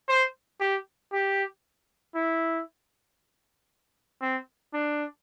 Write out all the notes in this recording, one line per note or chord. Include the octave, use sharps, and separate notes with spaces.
C5
G4
G4
E4
C4
D4